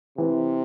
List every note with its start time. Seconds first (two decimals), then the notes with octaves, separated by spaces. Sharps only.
0.18 C3 E3